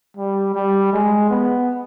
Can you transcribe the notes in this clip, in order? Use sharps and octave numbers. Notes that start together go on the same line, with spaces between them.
G3
G3
G#3
B3